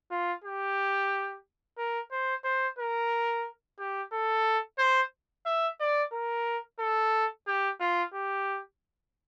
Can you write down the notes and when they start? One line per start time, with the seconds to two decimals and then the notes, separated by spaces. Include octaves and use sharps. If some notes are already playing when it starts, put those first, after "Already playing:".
0.11 F4
0.44 G4
1.78 A#4
2.11 C5
2.44 C5
2.78 A#4
3.79 G4
4.12 A4
4.79 C5
5.46 E5
5.80 D5
6.13 A#4
6.80 A4
7.47 G4
7.80 F4
8.14 G4